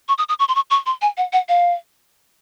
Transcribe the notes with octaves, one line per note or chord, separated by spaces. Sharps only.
C#6
D#6
D#6
C#6
C6
C#6
C#6
C6
G#5
F#5
F#5
F5